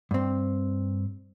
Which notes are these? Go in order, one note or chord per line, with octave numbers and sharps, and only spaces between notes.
G2 C4